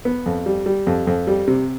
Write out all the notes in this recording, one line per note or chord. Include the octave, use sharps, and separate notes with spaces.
B3
F2
G3
G3
F2
F2
G3
C3